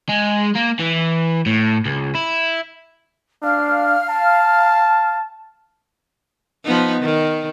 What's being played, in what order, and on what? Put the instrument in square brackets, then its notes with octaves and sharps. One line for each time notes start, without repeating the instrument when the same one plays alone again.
[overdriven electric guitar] G#3
A#3
E3
A2
C#2
E4
[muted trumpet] D4 [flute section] F5 F6
[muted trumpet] A5
[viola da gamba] F3 B3 D#4
D#3